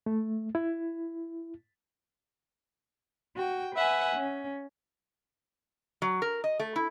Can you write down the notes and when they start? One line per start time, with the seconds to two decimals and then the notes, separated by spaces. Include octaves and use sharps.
0.06 A3
0.55 E4
3.35 F#4 G5
3.75 B4 E5 F#5 G#5
4.15 C#4
6.02 F#3
6.22 A#4
6.44 D#5
6.60 A3
6.76 E4